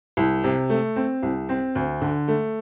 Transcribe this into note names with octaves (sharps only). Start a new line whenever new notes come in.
C2
C3
A3
C4
C2
C4
D2
D3
A3